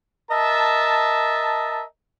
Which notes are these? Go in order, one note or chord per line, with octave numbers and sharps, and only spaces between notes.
A#4 D#5 E5 A5